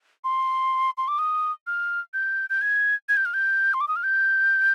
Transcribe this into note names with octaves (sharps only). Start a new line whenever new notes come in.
C6
C6
D6
D#6
F6
G6
G6
G#6
G#6
G6
F6
G6
C6
D6
D#6
F6
G6